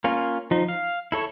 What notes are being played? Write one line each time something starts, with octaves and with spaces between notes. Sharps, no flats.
A#3 C#4 F4
F3 D#4
F5
E4 A4 C#5